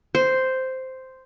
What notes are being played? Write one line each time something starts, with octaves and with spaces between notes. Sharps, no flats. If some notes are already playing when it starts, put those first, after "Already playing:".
C5